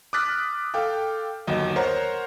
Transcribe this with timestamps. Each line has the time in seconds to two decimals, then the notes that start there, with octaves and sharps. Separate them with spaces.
0.13 D6 D#6 F6 F#6 A6 B6
0.74 A4 F5 G5 D6
1.47 G1 D#2 F#3 D#5
1.76 A#4 C5 C#5 F#5 A#5